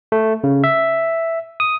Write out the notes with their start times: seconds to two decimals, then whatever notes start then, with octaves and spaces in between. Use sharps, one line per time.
0.12 A3
0.44 C#3
0.64 E5
1.60 D#6